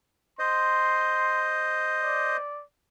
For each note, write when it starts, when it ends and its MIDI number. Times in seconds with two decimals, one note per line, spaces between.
0.39 2.37 72
0.39 2.37 75
0.39 1.45 84
2.03 2.63 74